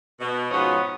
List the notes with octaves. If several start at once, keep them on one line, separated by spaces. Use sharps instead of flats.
B2
G#2 F3 B3 C#4 F#4 D#5